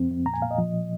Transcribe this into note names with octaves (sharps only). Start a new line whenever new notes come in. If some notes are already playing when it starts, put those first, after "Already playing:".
Already playing: F2 C4
F2
A#2 A#5
G#5
A#2 F5
D#5
F3